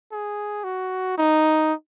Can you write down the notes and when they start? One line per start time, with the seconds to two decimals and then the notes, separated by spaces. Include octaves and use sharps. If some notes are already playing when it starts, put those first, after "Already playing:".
0.12 G#4
0.64 F#4
1.18 D#4